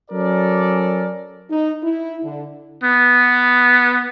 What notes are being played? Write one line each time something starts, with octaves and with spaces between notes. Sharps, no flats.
F#3 C#4 A4 A#4 D5
D#4
E4
D3
B3